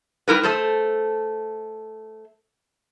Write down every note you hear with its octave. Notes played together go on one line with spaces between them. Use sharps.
G3 E4 A#4 B4
A3 A4 C5